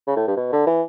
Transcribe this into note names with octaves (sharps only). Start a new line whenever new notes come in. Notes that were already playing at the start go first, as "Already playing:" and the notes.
C#3
A2
G2
B2
D3
E3